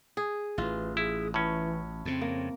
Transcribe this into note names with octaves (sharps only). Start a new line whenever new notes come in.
G#4
A1 E3 F4
E4 G#4
A2 E3 C#4
F2 C#3 C4
A#3